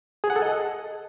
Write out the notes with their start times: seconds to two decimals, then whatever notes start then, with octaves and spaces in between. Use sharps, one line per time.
0.24 G#4
0.30 F#5
0.36 A4
0.42 D#5